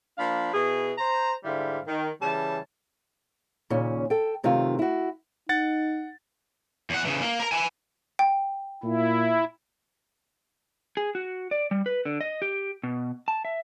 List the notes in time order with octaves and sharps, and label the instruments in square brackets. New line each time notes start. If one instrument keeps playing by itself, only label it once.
[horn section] F3 A#3 D4 F5 B5
B2 E4 G#4
C5 A#5
G#2 D3 G3 E4 F5
D#3
C#3 E3 G3 C#5 A5
[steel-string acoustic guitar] D#2 A#2 C#3 C#4
A4 G5
F#2 C3 D#3 A3 F4
E4 F#4
[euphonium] D#4 [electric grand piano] F#5 A6
[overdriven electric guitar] E2 F#5
C#3 E3
A#3
A#4 A#5
E4 G#5
[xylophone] G5
[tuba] A#2 [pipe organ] E4
[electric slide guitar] G#4
F#4
D5
G3
B4
D3
D#5
G4
B2
A5
E5